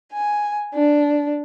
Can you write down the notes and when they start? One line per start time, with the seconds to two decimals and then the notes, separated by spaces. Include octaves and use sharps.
0.12 G#5
0.73 D4